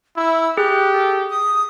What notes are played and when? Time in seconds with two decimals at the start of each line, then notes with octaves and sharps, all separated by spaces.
0.16 E4 E6
0.57 G4 G#4 F#6
0.92 A4
1.30 D#6